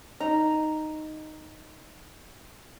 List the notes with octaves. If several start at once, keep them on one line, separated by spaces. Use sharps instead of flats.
D#4 A#5